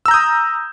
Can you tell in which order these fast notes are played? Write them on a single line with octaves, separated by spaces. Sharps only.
E6 A#5 G6 D#6